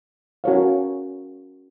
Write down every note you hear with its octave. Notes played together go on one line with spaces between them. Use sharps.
C#4 F#4 A#4 C#5 F5